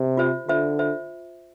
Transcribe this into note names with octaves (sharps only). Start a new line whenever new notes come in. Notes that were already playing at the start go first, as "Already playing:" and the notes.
Already playing: C3
F4 C5 E5
D3 F4 C5 E5
F4 C5 E5